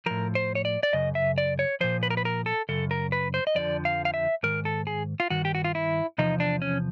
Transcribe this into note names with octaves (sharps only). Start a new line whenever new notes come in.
A2 F3 A#4
C5
C#5
D5
D5
F#2 C#3 D#5
E5
D5
C#5
A#2 F3 C5
B4
A#4
B4
A#4
A4
F#2 C#3 A4
A#4
B4
C5
D#5
F2 D3 F3 D5
F5
F5
E5
G#2 D#3 A#4
A4
G#4
F4
G2 D#3 F#4
G4
F#4
F4
E4
E2 C3 F3 D#4
D4
C#4